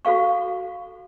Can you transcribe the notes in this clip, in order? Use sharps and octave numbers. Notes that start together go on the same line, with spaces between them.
F#4 A4 F5 C#6